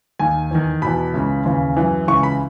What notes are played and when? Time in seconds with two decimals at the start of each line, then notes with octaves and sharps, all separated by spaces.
0.19 D#2 D#3 G#5
0.51 E2 D#3
0.82 E2 B2 B5
1.14 C#2 C#3 E3
1.45 D#2 C#3 E3
1.77 F#2 E3
2.07 C#2 C#3 E3 C#6
2.23 B5